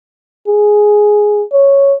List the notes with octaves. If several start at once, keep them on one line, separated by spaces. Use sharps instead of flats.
G#4
C#5